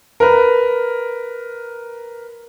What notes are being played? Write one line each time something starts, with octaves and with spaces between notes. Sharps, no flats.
A#4 B4